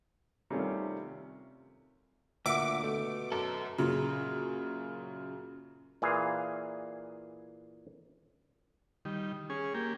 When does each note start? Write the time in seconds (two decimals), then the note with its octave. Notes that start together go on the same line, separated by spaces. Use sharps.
0.50 C3 D#3 G3 A3 C#4 F4
2.46 D2 A#2 E5 F#5 D6
2.84 B2 A3
3.32 F#2 A4
3.78 F#2 A#2 C#3
6.02 A#2 E3 G#4 F5
9.05 D#3 G3
9.50 C#4 G#4
9.74 A#3 G4